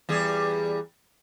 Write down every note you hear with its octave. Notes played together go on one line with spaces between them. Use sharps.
E2 G3 G#4